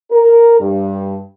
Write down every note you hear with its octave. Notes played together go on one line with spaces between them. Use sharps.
A#4
G2